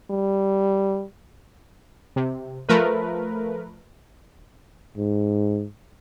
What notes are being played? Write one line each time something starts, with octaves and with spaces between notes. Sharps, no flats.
G3
C3
F3 A3 A#4 B4
G#2